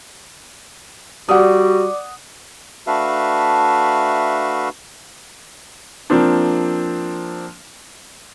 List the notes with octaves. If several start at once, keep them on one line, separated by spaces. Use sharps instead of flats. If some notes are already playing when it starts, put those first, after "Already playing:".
G3 F#4 D5 F#5 D6 D#6
A3 D4 F#4 B4 E5 F5
F3 A#3 C4 D4